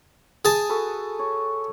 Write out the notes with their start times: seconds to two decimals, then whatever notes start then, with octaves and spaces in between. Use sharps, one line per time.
0.45 G#4 A5
0.70 F#4 A4 B4
1.19 C#5